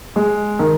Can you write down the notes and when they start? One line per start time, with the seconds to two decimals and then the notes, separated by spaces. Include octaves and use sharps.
0.16 G#3
0.59 D#3